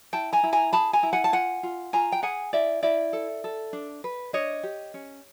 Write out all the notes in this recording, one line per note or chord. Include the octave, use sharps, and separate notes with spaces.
E4 G5 A5
G#5 A#5
E4
G#5 A#5
G#4 A5 B5
G#5 A#5
E4
F#5 G#5
A5
F4 F#5 G#5
F4
F4 G#5 A#5
G5
G#4 F#5 G#5
E4 D5 E5
E4 D5 E5
A4
A4
D4
B4
D4 C#5 D#5
G4
C#4